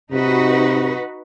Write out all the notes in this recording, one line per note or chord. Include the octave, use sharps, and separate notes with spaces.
C3 D#4 F#4 B4